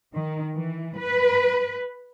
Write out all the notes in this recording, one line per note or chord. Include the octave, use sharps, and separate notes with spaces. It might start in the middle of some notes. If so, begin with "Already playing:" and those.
D#3
E3
B4